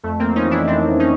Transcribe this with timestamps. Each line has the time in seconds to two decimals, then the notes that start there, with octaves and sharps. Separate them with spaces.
0.03 F2 A3
0.19 A#3 C4
0.25 F2
0.35 C#4 D#4
0.46 E3
0.51 D4 E4
0.67 F2 C4 D4
0.88 F2
1.00 C#4 D#4